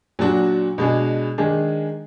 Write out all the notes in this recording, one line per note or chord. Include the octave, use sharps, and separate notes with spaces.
A#2 F#3 D4 F#4
B2 G#3 D4 G#4
D#3 G#3 D4 G#4